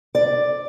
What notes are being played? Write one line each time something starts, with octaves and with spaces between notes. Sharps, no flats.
D5